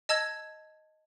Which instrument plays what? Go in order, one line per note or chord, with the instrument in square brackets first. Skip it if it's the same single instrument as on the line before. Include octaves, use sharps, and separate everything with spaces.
[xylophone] D#5 A5 E6 G#6